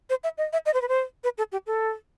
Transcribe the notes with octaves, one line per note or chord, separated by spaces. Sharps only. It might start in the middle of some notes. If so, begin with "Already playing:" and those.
C5
E5
D#5
E5
D#5
C5
B4
C5
B4
A4
G4
A4